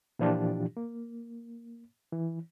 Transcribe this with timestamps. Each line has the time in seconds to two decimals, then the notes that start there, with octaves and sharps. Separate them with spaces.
0.19 A#2 E3 F3 D4 F4 G4
0.77 A#3
2.12 E3